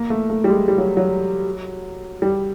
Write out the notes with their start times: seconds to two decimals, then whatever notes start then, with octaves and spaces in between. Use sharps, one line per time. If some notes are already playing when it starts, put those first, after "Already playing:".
Already playing: A#3
0.10 A3
0.30 A3
0.44 G3
0.49 G#3
0.68 G3
0.78 F#3
0.97 F#3
2.22 G3